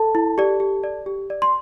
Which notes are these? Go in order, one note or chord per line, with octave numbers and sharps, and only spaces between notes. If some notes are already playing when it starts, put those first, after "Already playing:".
Already playing: A4 A5
E4
G4 D5
G4
D5
G4
D5
C6